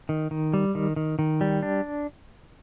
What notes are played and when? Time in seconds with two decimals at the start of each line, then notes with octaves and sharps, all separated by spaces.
0.09 D#3
0.31 D#3
0.54 G3
0.75 D#3
0.96 D#3
1.19 D#3
1.41 G3
1.63 D4